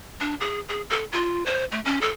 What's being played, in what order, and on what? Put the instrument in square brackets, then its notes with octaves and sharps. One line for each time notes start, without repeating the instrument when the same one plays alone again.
[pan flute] D4
G#4
G#4
A4
F4
C5
A3
C#4
A4